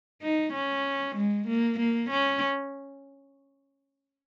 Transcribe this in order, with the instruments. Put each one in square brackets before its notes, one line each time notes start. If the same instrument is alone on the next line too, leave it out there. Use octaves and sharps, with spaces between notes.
[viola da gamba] D#4
C#4
G#3
A#3
A#3
C#4